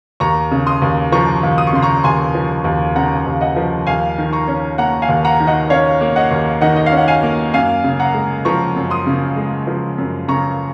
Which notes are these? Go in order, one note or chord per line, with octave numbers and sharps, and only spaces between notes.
D#2 A#5 C#6
C#3
C6 D#6
D#2
F3 A#5 C#6
D#2
D#6
C#6
C#3 C6
A#5 C#6
D#2 G#5 C6
F3
D#2
C#3 F#5 A#5
D#2
D#5 F#5
F3
D#2 F5 G#5
D#3
A#5 C#6
C#4
A#3 F#5 A#5
F5 G#5
D#2
F#5 A#5
D#3
D#5 F#5
C#4 C#5 F5
A#3
D#5 F#5
D#2
D#3 D#5 F#5
D#5
F5
C#4
F#5
F5 G#5
A#3
F#2 F5 G#5
C#3
F#5 A#5
G#3
F3 A#5 C#6
F#2
C6 D#6
C#3
G#3
F3
F#2
C#3 A#5 C#6